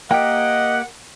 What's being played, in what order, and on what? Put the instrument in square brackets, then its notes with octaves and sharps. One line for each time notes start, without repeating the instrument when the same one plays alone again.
[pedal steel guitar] A#3 G4 [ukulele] A#4 G5 [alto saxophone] D#5 [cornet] F#5